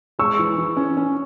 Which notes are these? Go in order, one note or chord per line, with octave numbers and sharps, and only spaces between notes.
G#3 C#6 E6
E3
E3
C#4
C#4